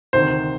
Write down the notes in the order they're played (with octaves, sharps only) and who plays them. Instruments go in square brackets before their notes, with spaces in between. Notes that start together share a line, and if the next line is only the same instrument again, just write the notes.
[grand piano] D2 C3 D#3 C5